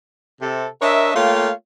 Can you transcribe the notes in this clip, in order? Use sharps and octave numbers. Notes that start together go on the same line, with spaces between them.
C3 A4
D4 A#4 C#5 D#5 E5
A3 A#3 F4 C#5 F5 G5